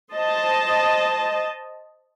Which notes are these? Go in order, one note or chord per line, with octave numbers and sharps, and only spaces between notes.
C5 D#5 A5